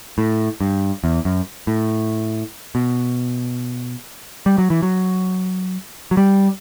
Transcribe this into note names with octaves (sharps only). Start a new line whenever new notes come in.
A2
G2
E2
F#2
A2
B2
G3
F#3
E3
F#3
F#3
G3